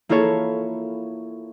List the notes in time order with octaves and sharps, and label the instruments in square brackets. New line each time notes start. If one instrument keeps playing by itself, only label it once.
[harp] A#3 E4 F4 A4 C#5